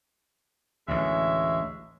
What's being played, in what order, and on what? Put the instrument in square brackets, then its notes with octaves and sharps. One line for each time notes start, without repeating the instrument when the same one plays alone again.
[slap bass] A1 D2 [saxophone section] G#3 C#5 E5